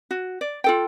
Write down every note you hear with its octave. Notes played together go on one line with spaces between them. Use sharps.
F#4
D5
F4 A4 G5